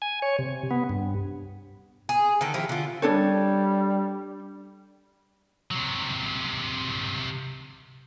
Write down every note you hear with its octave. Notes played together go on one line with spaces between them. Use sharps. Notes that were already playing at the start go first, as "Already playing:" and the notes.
G#5
C#5
C3
B3
G2
G#4
D3 D#3 A4
F3 E4 G4
D3 F4
G3 D4 A4 C#5
C3 F#3